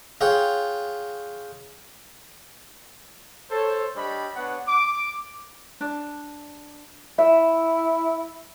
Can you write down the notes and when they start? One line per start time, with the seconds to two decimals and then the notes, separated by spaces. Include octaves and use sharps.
0.21 F4 G#4 C#5 F#5 G5
3.51 A4 C5 C#5
3.96 G3 D4 G4 C#5 D#5 B5
4.36 B3 D4 C#5 F#5
4.68 D6
5.81 D4
7.18 E4 E5